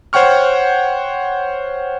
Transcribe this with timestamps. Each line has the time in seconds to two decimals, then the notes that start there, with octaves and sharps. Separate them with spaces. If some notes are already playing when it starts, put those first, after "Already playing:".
0.13 C5 C#5 F#5 G5 C#6 F6